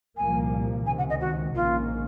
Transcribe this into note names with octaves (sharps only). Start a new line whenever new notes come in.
C2 A#2 F3 A#3 G#5
C#2 C3 D#3 G#5
F#5
D#5
F#4
A#1 G#2 D#3 A#3 C#4 F4